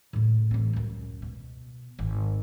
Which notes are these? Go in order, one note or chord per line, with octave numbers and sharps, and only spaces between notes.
A2 C#3
A1 C4
C#2 F#2
B2
G#1